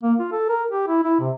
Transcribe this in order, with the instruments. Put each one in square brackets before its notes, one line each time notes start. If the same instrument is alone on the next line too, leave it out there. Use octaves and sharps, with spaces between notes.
[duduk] A#3
F4
A4
A#4
G4
E4
E4
C3